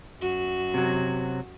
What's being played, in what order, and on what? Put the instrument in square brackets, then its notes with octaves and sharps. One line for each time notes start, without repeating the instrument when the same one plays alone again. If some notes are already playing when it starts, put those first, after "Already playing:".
[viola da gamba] F#2 F#4
[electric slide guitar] C3 F#3